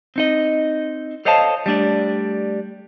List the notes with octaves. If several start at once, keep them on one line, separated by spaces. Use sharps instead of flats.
C4 D#4 D#5
A4 C5 C#5 D#5 F5 A5
G3 A3 D4 D5